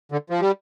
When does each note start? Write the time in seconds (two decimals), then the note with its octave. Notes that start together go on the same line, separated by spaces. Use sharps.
0.12 D3
0.30 F3
0.41 G3